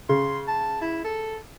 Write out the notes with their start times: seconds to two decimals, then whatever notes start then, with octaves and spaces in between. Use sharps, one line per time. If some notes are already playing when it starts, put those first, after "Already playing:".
0.09 C#3 C6
0.48 A5
0.81 E4
1.04 A4